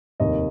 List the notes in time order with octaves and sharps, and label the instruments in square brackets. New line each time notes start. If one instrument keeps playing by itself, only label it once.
[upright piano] F1 D#2 D#3 A#3 D#5